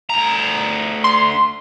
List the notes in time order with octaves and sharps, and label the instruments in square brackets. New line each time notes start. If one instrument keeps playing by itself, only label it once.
[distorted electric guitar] D2 A#5
[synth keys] C6